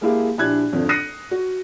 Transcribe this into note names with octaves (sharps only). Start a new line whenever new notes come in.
G#3 A#3 E4 G4 G#4 F5
A#1 D4 E4 G4 F#6 G#6
G#1 F2 D3
D#6 F#6 A#6 C7 C#7 D#7
F#4